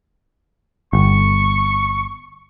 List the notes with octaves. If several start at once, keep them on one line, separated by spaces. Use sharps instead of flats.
G1 C#6